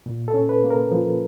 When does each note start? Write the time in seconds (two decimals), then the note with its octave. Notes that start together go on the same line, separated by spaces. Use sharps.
0.06 A#2
0.28 A4
0.34 C#4
0.49 B4
0.64 A#3
0.70 A#4
0.92 F3